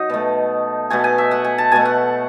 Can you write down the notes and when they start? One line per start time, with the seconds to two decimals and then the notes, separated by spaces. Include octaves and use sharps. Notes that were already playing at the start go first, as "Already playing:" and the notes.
Already playing: F#3 D#4
0.10 B2 A3
0.90 B2 A3 G#5
1.04 G#5
1.18 E5
1.31 F#5
1.44 G#5
1.58 A5
1.72 B2 A3 G#5
1.85 F#5